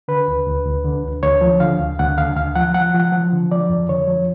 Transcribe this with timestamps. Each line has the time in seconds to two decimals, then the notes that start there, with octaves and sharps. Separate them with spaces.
0.08 D3 B4
0.28 D2
0.46 D2
0.65 D2
0.84 D3
1.04 D2
1.23 D2 C#5
1.41 F3
1.60 D3 F5
1.79 D2
1.99 D2 F#5
2.18 D3 F5
2.37 D2 F5
2.55 F3 F#5
2.74 F3 F#5
2.94 F3
3.00 F#5
3.12 F3
3.32 D3
3.52 F3 D5
3.69 F2
3.89 D3 C#5
4.08 F3